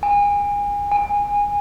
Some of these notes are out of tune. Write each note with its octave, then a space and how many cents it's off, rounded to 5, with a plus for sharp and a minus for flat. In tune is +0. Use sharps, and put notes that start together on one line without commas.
G#5 -30
G#5 -20